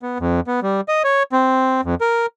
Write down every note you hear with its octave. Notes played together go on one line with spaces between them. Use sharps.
B3
F2
B3
G3
D#5
C#5
C4
F2
A#4